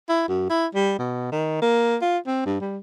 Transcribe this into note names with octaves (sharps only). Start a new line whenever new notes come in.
E4
F#2
E4
G3
B2
D#3
A#3
F4
C4
G2
G3